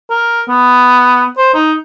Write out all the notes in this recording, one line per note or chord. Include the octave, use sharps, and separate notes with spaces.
A#4
B3
C5
D#4